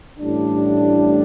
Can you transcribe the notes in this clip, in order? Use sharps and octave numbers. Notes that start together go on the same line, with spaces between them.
A1 A2 G3 D4